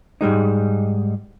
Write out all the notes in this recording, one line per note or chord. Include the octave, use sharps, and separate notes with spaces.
G#2 G3 G#3 D#4